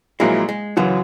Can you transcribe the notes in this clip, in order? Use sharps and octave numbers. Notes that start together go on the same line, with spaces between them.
A#1 A#2 F#3 G#3 A#3 E4
G#3
F#2 C#3 E3 F#3